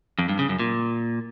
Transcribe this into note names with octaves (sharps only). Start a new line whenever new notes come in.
F2
G2
C#3
F#2
A#2